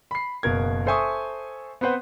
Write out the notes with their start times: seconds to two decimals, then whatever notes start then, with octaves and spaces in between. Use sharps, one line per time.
0.11 B5 C7
0.43 F#1 B2 A#4 G#6
0.86 A4 C5 E5 G#5 C#6 D#6
1.81 B3 C4 B4 C5 F#5